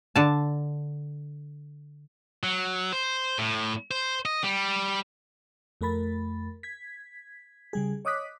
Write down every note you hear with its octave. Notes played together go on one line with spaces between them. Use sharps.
D3 A5
F#3
C5
A2
C5
D#5
G3
F2 A3 A#4 B5 A6
G#6 B6
C#3 G3 G#4
C#5 D#5 D6 D#6 F#6 B6